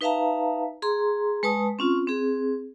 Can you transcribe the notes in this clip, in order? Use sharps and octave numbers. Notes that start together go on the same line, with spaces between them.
D#4 B4 E5 F5 A5 A#5
G#4 A#5 C6
G#3 B4 A5 D#6
C4 C#4 F4
C4 G#4